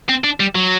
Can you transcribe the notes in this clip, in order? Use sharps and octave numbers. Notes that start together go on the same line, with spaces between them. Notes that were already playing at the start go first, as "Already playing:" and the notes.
C4
D4
G3
F#3